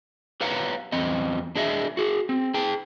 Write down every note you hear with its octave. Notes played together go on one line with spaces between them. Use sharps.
G4 B4 C#5 F5 F#5 A#5
E2 C4 D#5
D4 G#4 D#5 E5
F#4 G#4
C4
G#4 G5 A5